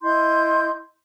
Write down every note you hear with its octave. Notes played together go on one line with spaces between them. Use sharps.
E4 D#5 C6 G6